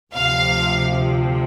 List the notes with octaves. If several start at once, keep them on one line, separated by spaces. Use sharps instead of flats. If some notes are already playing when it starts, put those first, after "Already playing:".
D2 C3 F3 F5